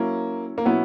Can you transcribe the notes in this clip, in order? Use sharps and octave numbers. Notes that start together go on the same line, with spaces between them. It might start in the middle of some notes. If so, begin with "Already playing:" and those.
Already playing: F#3 A#3 C#4 E4
A#3
B2 F#3 B3 C#4 E4